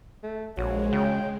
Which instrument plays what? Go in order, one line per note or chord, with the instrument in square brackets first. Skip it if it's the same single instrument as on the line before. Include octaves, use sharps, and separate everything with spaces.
[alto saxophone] A3
[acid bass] A#1 [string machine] G#3 [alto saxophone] F#4 [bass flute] C#5
[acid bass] C#3 [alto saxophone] G5